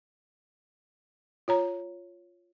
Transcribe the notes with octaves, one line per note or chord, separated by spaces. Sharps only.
F4 C#5 A#5